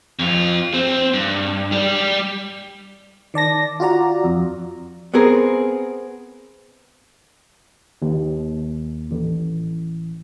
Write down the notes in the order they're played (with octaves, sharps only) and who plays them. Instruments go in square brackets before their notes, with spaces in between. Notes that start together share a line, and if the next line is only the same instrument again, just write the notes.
[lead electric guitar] F2 F4
C4
G2
G3 D5
[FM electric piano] D#3 D5 A5 A#6
F4 F#4 D5 A#5
F2
[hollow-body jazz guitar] B3 C4 G#4 A#4
[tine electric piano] D#2
A1